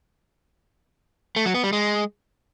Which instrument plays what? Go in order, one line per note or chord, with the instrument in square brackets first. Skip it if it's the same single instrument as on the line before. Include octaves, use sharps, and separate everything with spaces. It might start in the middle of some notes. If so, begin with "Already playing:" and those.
[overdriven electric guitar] A3
F#3
B3
G3
G#3